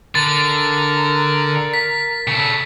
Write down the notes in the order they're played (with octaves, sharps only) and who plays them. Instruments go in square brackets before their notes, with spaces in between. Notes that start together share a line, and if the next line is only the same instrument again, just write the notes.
[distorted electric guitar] D3 [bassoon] A#4 [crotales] A6
[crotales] B6
[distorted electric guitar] C#3 A4